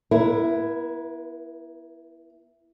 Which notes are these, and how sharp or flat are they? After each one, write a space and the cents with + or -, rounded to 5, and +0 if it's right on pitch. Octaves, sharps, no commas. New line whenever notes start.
B3 -10 E4 +10 A#4 +40